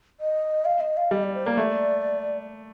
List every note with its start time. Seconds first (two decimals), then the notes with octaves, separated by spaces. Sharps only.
0.20 D#5
0.65 F5
0.80 D#5
0.97 F5
1.11 G3 D#5
1.23 D5
1.35 C5
1.46 A#3 D5
1.57 A3